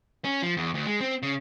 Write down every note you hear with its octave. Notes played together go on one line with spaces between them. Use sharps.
C#4
F3
E2
D2
G#3
C4
C#3